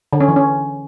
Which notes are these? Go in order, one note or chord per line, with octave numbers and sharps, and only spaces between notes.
D3
C#4
E3
C#4